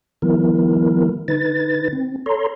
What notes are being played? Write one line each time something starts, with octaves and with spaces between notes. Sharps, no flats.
D#3 F3 G3 B3 E4 A#4
D3 D#4 B4 A6
C4
A4 C#5 A#5 C6